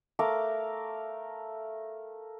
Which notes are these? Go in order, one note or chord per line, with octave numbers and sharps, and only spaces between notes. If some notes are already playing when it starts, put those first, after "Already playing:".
A3 A#4 F5 D6